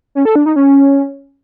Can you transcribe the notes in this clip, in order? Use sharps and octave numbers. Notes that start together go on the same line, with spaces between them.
C#4
A4
D4
D#4
C#4